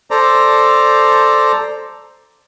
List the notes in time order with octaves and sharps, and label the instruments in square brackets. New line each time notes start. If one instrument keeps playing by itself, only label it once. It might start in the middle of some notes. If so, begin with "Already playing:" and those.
[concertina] A4 C5 D5 A#5